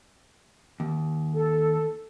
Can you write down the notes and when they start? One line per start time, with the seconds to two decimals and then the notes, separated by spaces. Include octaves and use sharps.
0.80 D#2
1.33 A4